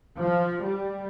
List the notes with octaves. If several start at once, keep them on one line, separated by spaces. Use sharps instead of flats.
F3
G3